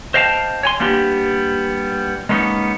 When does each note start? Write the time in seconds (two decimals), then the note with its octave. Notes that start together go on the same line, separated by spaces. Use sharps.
0.14 C5 D#5 F5 G5 A5
0.63 C#5 G#5 C6
0.80 G3 A#3 B3 D4 D#4 G4
2.29 G#3 A#3 B3 C#4 D#4